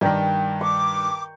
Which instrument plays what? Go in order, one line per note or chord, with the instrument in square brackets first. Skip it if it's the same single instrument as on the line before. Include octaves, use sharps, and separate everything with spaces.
[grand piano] G2 D#3 [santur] A#4 D5 G5
[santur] C#6 [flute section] D6